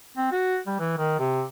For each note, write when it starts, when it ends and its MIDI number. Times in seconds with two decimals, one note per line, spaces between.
0.17 0.30 60
0.32 0.58 66
0.67 0.77 55
0.80 0.96 52
0.98 1.17 51
1.20 1.44 48